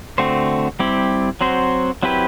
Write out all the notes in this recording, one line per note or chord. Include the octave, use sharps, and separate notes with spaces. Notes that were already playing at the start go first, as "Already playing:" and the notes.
D3 A3 C4 F#4 C5
G3 C4 E4 G4
F#3 C4 F#4 C5
F#3 C4 E4 G4 B4